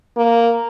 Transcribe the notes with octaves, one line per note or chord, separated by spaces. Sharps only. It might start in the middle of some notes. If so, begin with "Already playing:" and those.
A#3